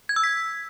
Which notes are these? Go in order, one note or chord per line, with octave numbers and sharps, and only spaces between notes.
G#6
E6
B6